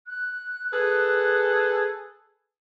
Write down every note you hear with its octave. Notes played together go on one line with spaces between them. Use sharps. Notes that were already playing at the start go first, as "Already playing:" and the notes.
F#6
G#4 A4 B4